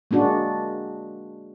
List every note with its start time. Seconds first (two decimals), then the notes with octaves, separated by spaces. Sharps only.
0.11 G#3 A#3 D4 F#4